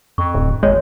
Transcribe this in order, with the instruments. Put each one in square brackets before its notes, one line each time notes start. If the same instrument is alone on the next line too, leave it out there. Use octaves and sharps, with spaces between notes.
[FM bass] F2 [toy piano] C#6
[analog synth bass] D1
[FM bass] G#1 [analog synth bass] G#3 [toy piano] C#5